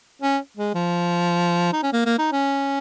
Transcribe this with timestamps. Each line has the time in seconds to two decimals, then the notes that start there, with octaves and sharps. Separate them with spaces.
0.22 C#4
0.57 G#3
0.74 F3
1.72 D#4
1.83 C#4
1.93 A#3
2.06 A#3
2.19 D#4
2.32 C#4